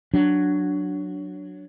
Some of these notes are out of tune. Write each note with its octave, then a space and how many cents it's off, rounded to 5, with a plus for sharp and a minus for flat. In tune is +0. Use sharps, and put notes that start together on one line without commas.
F#3 +0 D4 +0